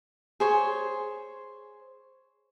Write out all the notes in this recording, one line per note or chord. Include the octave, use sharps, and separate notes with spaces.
G#4 C5 C#5